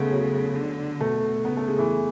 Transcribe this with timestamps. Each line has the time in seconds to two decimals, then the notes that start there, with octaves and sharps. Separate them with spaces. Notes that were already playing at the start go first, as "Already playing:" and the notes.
Already playing: C#3 G#3 A3 B3
0.11 F#3
0.55 D3
1.01 B2 A3
1.45 C#3 B3
1.57 A3
1.68 G#3
1.79 E3